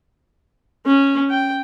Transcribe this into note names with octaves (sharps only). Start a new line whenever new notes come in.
C#4
G5